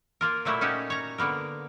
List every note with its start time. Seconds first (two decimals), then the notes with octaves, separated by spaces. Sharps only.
0.21 A#3 F4 A#4
0.45 A#2 F#3 A3 A#3 E4
0.61 C#4 D#4 F#4 G4
0.90 C#5 A#5
1.18 D3 A#3 B3 A#4